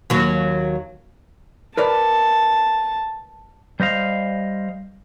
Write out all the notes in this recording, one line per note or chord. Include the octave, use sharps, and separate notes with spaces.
D#2 F#3
A#4 B4 D5 A5
G3 C5 D#5 F5